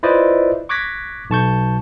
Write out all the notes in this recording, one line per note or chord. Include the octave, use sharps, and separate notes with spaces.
E4 F4 B4 C5 D5 D#5
C#6 D6 F#6 G#6 A#6 B6
B1 A5 C#6 G6